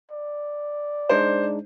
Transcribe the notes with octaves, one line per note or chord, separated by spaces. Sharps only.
D5
G#3 D4 D#4 C5